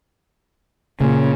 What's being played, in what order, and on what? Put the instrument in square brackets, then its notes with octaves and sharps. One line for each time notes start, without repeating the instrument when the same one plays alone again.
[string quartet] A#2 [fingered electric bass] C#3